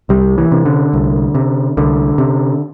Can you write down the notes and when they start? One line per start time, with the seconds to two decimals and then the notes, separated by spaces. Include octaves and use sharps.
0.09 C2 G3
0.38 E3
0.52 C3
0.65 D3
0.93 C2
1.35 C3
1.77 C2 D3
2.18 C3